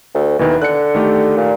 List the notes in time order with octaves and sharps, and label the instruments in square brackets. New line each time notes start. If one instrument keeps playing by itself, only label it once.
[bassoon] D2
[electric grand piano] D#2 B2 D#3 [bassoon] E3
[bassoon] D3 [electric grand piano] F#6 C#7
[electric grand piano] D#3 A3 G4
[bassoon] A#2